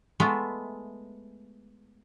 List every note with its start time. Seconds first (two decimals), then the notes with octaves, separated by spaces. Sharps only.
0.20 G#3 A3 B3 F4 E5